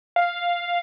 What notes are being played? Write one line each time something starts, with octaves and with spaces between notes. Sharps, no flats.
F5